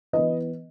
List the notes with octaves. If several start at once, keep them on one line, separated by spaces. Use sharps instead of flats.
E3 B3 B4 D#5